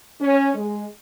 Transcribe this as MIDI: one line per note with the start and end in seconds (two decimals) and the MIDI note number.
0.21 0.53 61
0.55 0.85 56